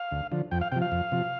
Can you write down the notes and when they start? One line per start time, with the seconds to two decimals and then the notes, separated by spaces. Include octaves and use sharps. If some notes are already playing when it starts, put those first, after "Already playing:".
Already playing: F5
0.11 D2
0.32 D3 F3
0.51 F2 G5
0.61 F5
0.72 C3 F3 G5
0.82 F5
0.92 F2
1.12 C3 F3